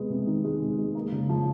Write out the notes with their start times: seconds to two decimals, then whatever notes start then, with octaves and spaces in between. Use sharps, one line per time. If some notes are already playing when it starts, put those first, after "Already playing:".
Already playing: C3 G#3 B3
0.10 C3
0.27 D#3
0.44 G#3
0.61 C3
0.78 G#3
0.95 A#3
1.12 C#3
1.29 F3